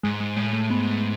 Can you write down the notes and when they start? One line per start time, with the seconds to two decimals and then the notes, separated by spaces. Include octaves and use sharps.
0.03 G#2 G#3
0.20 G#3
0.36 A2 G#3
0.53 A3
0.69 G#2 B3